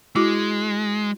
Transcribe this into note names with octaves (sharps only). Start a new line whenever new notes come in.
G#3 E4 F#4 D6